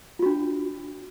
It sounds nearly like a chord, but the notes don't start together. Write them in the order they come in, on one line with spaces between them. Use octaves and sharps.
F4 F#4 D4